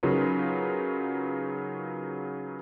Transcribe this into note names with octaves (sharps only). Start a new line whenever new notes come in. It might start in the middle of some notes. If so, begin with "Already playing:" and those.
C#3 F#3 D#4 F4 A#4 B4